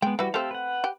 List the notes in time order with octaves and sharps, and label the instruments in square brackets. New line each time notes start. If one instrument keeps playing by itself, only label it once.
[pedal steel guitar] G#3 B3 [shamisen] G5
[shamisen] E3 B4 [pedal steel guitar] G3 F#4
[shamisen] A3 C4 [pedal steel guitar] G4 A4 F5
[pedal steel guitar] B4 F#5
[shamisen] G4